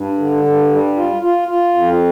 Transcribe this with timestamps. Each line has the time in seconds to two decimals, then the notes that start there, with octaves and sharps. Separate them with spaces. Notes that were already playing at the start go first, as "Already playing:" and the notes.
Already playing: G2
0.18 D3
0.44 G2
0.70 G3
0.96 F4
1.22 F4
1.48 F4
1.75 F2